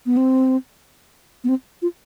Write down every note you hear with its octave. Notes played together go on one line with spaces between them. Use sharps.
B3
C4
B3
C4
F4